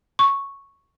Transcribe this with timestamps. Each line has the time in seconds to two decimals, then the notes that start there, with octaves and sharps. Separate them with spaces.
0.19 C#6